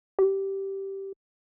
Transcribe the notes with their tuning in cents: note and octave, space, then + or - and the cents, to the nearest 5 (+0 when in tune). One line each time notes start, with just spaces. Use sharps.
G4 -10